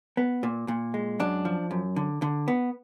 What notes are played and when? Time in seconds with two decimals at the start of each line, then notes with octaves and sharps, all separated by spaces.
0.17 B3
0.43 A#2
0.68 A#2
0.94 G#3
1.20 F#2 D4
1.45 F3
1.71 F#2
1.96 D3
2.22 D3
2.48 B3